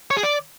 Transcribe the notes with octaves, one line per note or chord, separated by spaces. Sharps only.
C#5
G#4
D5